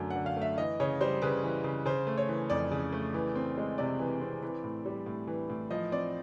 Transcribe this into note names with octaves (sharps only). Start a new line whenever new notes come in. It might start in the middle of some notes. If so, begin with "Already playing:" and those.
Already playing: F#2 D3 F#3 A3
D3 F#5
F5
A3 E5
E3 D#5
C#3 C#5
G3 C5
C#3 B4
E3
C#3
C#3 C5
A3
C#5
E3
F2 D5
C#3
A3
E3
C4
G#3
C3 D5
E3
C4
E3
A2
G3
A2
E3
A2
F3 D#5
C4 D5